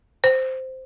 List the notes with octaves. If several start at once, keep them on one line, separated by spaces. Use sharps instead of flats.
C5